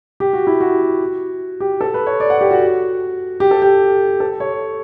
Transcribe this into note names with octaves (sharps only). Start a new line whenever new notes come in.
G4
F#4
E4
F#4
G4
A4
B4
C#5
D5
F#5
G4
F#4
G4
A4
G4
A4
C#5